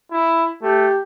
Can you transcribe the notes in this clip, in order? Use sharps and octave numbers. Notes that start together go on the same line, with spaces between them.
E4
A3 G4